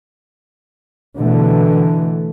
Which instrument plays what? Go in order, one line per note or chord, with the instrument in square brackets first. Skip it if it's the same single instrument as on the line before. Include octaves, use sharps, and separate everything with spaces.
[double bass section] B2 D3 E3 A3